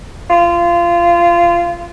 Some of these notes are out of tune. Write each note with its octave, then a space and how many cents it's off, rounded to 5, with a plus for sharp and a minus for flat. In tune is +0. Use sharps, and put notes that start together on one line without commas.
F4 -20